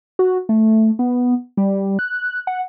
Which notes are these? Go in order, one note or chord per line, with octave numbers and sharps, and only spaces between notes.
F#4
A3
B3
G3
F#6
F#5